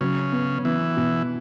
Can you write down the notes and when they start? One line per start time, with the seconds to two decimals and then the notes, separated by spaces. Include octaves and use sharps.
0.01 C#3 F#3
0.32 B3
0.64 E3 B3
0.97 B2